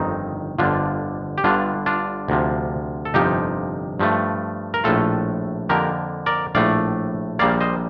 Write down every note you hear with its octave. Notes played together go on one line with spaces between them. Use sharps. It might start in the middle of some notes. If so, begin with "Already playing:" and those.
Already playing: G1 F2 D#3 C4 D#4
G1 F2 D3 F3 D4 F4
G4
G1 G2 D3 D4 F4
D4 F4
D2 C3 F3
A4
G1 F2 C3 F3 D#4 G4
G2 F3 A3
A#4
A#1 A2 A3 F4 A4
F2 D3 F3 A#3 G4 A#4
A#4 D5
A#1 A2 A3 D5 F5
A#1 A#2 G3 A#3 D5 F5
C5 D#5